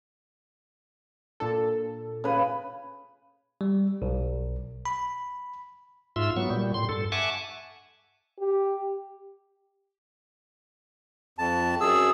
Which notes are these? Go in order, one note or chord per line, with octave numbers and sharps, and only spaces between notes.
A#2 D4 A4
C#3 B4
G3
B1
B5
G#2 F4 E5 C6 E6
F#3 B3 C#6
A#2 G3
A2 C6
G2 A4
E5 F#5 G#5 A5 C#6 D6
G4
F2 A5
F#2 G#4 E6